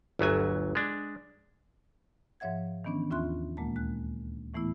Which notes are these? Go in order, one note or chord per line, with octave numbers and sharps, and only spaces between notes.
G1 D2 F#3 G#5
G#3 D4
G#2 F3 C#5 E5 F#5 G#6
D#3 E3 B3 C#4 D4
D#2 C#4 F4 E5 C6 F#6
D2 A#2 G#3 A#3 A5
G#3 F#6
A2 E3 A3 B3 E4